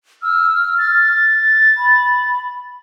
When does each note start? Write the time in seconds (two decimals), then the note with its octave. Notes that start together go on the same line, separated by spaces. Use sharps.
0.22 E6 F6
0.78 A6
1.77 B5